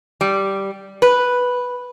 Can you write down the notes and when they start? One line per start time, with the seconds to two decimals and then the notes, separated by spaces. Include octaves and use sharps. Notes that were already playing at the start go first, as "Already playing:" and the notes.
0.21 G3
1.02 B4